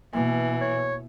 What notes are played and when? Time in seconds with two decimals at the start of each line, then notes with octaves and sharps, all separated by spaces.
0.13 B2 E3 A#3
0.61 C#5